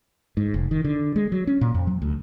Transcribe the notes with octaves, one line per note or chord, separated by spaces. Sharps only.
G#2
F1
D#3
D3
G#3
F#3
C#4
A#2
F2
F#3
D2